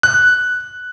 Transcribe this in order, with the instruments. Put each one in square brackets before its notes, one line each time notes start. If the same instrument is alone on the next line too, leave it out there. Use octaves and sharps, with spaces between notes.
[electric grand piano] F#6